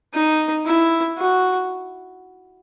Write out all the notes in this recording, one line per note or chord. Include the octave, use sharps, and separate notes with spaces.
D#4
E4
F#4